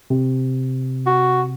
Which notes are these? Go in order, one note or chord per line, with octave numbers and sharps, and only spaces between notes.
C3
F#4